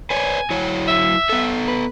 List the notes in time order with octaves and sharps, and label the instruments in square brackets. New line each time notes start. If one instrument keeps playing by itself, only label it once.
[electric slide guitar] B4 C#5 D5 [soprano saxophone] G#5
[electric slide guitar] F#3 E4 C#5
[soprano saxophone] E5
[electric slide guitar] B3 A4
[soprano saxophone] B4